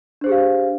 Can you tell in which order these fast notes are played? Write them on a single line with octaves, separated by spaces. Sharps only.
D4 C5 G#4 G4 F5